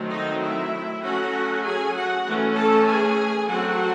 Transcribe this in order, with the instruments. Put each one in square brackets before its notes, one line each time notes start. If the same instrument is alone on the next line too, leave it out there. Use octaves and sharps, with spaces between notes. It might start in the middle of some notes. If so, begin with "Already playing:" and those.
Already playing: [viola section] D#3 F#3 A3 C4
D#4 D#5
E4 E5
F#3 A3 C#4 F#4 F#5
G#4 G#5
F#4 F#5
E3 A3 C#4
A4 A5
G#4 G#5
F#3 A3 C4 F#4 F#5